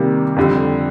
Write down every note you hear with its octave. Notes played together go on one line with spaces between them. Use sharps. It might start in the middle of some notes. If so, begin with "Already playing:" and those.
Already playing: C3 D#3 G3 A#3
F2 D3 G3